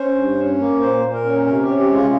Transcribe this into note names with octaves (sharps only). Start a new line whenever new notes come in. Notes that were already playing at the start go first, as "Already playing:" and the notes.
Already playing: C#4 C5
G2
C#4
A#3
A#2 C5
A#2
A#4
C#4
C3 A#4
G4
C#4
G4
G#3 F4